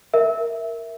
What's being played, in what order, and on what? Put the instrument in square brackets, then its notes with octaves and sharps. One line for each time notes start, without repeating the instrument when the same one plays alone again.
[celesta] A#4 E5